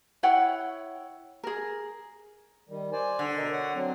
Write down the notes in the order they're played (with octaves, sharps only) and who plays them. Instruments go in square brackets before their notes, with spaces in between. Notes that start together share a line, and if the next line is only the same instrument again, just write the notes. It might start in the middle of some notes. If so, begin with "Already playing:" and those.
[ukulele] E4 C#5 F#5 G5
G#4 A#4
[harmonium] D#3 G3
C5 D5 G#5
[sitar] D3
[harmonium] B2 A#4 D#5
C#5 F#5
F#3 C4